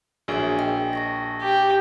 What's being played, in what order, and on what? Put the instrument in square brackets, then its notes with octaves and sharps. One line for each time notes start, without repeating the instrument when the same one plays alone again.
[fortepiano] A#1 G#4 [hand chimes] F#4 C#5 E5
[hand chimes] D#5 G5
A5 C#6 A#6
[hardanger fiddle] G4